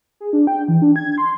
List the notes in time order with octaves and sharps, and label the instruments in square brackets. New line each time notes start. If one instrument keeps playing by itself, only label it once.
[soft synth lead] G#4
D4
G5
E3
D4
G#6
C6